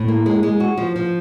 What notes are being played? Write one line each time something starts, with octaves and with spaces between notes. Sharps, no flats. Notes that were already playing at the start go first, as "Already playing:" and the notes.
Already playing: A2
A#3
G#3
G#3
F#4
F3
F3